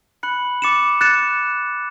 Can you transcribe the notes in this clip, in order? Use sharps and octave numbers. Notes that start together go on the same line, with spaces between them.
B5 F#6 C#7 F#7
D6 A6 C#7 E7
F#6 A6 C#7 E7